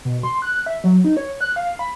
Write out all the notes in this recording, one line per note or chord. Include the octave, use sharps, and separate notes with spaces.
B2
C6
F#6
E5
F#3
D#4
C#5
F#6
F5
B5